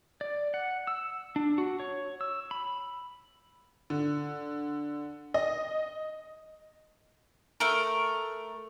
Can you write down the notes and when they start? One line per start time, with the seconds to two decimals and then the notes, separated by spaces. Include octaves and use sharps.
0.21 D5
0.54 F#5
0.87 E6
1.36 D4
1.58 F#4
1.80 C#5
2.21 E6
2.51 B5
3.90 D3
5.34 D#5
7.60 A3 A#4